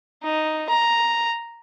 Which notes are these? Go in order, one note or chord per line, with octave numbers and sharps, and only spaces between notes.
D#4
A#5